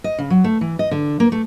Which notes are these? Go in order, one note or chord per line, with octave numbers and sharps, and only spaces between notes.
D#5
C#3
F#3
A3
E3
D#5
D3
A#3
A3